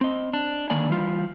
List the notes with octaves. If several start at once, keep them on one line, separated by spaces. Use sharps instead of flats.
C4 D#5
D4
D3 D#3 A#3 D5 G#5
E3 G3 F4